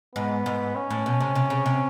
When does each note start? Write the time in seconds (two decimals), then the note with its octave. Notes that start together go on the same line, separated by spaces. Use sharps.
0.16 G#2 B3
0.46 G#2
0.75 C#4
0.91 A2
1.06 B2
1.20 C3
1.35 C3
1.50 C#3
1.66 C3